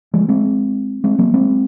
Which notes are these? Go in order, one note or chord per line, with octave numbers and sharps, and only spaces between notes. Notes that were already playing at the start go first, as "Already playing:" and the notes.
F3 G#3
G#3 C4
G#3 C4
F#3 A#3
G#3 C4